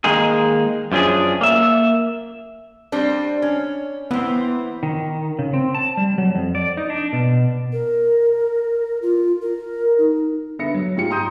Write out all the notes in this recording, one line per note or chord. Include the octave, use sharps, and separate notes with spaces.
D#3 G#3 A#3 D#4 G#4
F#2 F3 C#4 D4 G#4
A#3 E5
G3 C4 D4
C#4
E3 B3 C4
D#3
C#3
C4
A5
G3
F#3
F2
D5
D#4
D4
B2
A#4
F4
A#4
D#4
D3 B3 E5 A#6 C#7
F#3
G#2 F4 G4 C#7
G5 A#5 C6 D#6 G6 D#7